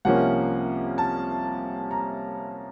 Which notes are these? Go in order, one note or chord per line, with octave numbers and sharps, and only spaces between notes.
C2 C3 F3 A#3 C#4 F#5
A5
A#5